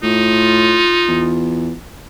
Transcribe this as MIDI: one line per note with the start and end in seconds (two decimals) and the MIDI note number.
0.03 0.83 45
0.03 1.37 63
0.03 1.75 65
1.08 1.72 40